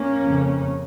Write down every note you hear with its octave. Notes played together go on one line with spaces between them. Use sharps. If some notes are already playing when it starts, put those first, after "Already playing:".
Already playing: A#3 C#4
F2 C#3